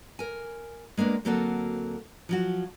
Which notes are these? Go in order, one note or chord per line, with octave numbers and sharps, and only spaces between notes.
A#4 G#5
G#3 A#3 B3 D4
D2 F#3 A#3 C4 F#4 A4
F3 F#3 F#4